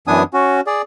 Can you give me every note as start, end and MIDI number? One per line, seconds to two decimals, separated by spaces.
0.07 0.23 42
0.07 0.23 52
0.07 0.23 59
0.07 0.23 62
0.07 0.23 80
0.07 0.23 87
0.34 0.60 61
0.34 0.60 66
0.67 0.82 68
0.67 0.82 74